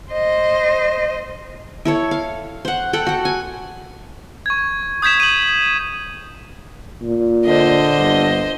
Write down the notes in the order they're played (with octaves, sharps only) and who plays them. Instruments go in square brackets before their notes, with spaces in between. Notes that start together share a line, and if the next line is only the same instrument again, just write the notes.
[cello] C5 D#5
[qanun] E4 A4 C#5
F5
C5 F#5
A4 F#5 G5
F#4 F#5
G#5
[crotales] C#6 G#6
D#6 G6 G#6 B6 E7
D#7 F#7
[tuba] A#2
[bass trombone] D3 [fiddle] C5 D#5
[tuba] G1